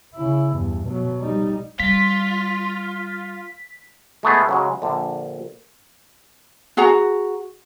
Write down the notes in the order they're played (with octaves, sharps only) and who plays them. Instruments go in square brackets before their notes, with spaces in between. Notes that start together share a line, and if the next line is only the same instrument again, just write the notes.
[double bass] C#3 E4
E2 G2
B2 F#3
G3 D#4
[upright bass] G3 [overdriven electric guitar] F4 [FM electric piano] B6
[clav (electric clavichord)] G#3 A3 B3 G#4
C#3 F#3 G#3
A#1 D3
[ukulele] F#4 G#4 F#5 A#5